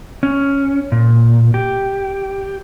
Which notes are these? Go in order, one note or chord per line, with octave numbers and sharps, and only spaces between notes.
C#4
A#2
G4